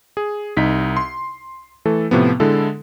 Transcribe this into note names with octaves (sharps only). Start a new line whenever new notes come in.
G#4
C2 D#4 B6
C6
E3 A3 A4
A2 C3 F3 B3
D3 G#3 E4 A4